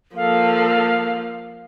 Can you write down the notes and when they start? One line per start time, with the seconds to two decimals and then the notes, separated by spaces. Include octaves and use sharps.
0.16 F3 A#3 A4 F5